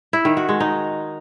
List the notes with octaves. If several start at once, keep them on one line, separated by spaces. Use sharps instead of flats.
E4
D#3
F#4
G#3
D#4